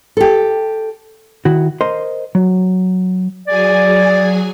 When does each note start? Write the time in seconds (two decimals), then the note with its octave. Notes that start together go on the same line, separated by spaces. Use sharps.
0.17 G4 A4
1.45 D#3 E4 F#4
1.81 A#4 C5 D#5 C6
2.35 F#3
3.47 F#3 G#4 D5 G#5